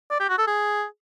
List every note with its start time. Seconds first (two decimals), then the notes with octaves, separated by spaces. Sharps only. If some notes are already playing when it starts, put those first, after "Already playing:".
0.11 D5
0.20 G4
0.29 F#4
0.38 A4
0.47 G#4